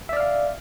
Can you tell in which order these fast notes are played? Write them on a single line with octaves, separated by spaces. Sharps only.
E5 D5 F6 F5